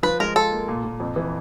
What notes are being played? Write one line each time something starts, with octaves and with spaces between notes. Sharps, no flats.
F3 B4
G#3 A#4
F4 A4
A#3
A#2
A#2
F2
E3